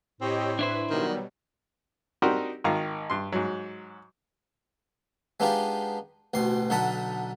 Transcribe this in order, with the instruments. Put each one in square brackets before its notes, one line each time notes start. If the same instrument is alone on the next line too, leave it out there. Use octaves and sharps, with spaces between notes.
[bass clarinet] A2 [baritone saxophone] C4 [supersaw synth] G4 C#5 D#5
[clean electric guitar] D4 E4 C5 [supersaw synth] B4
[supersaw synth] B2 F#3 G3 [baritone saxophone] D#3
[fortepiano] C4 D4 D#4 F#4 G4 A#4
G#1 D#3 F5 A#5
G2 C6
G#2 F#3
[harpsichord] G#3 B3 D4 D#4 F4 G4
A1 D2 B2 C6
B1 D3 D#4 F#5 A5 B5